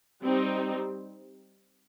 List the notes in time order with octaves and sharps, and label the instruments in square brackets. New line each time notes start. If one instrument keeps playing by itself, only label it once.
[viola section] G3 C4 D#4